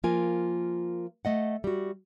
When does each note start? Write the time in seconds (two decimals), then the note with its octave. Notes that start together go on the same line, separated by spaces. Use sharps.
0.04 F3 A#3 F4 A#4 G#5
1.25 A3 D#5 F#5
1.64 G3 F#4